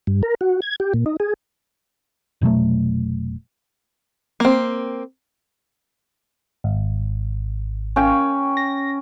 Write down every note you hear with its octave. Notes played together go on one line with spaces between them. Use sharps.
G2
A#4
F#4
G#6
G4
A#2
D#4
G#4
F1 B2 F#3 A3
A#3 C4
G#1
C#4 G5
A#6